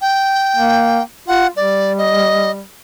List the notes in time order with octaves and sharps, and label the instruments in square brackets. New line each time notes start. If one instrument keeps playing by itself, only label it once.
[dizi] G5
[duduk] A#3
[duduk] F4 [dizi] F#5
[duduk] G3 [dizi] D5
[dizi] D#5